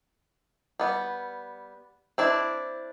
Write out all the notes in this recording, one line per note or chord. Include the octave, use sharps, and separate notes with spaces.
G3 B3
C4 D4 E4